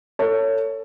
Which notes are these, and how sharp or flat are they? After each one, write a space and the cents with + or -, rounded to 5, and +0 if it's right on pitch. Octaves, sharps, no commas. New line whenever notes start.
A4 +30 C#5 +10